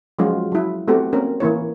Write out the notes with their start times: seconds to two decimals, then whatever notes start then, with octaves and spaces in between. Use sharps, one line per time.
0.19 F3 F#3 G#3 C#4 F4 F#4
0.52 F#3 E4
0.88 A3 B3 C4 F#4 G4 A4
1.12 A#3 C4 C#4 A#4
1.40 E3 A#3 E4 C#5